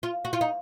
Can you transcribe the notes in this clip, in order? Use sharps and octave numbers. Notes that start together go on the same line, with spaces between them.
F4
F#4
F4
D#4